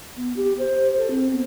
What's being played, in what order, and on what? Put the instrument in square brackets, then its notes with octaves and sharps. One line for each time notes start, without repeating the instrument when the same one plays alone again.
[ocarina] B3
G4
C5
A4
C4
B3